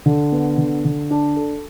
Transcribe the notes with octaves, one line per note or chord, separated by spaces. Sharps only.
D3
B3
D3
D3
D4
A4